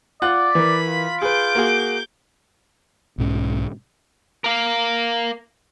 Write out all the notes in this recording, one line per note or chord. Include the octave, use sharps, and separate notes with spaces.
F4 D5 F#5 F#6
E3 A#4 B5
F4
G#4 B4 D6 G6
A#3 F#4 G#4
B1 G#2 C#4
A#4 F5